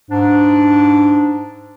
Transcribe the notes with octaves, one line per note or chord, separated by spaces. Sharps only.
G#2 D4